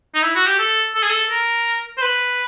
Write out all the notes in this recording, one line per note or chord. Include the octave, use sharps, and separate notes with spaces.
D#4
E4
F#4
G4
A4
A4
G#4
A4
A#4
C5
B4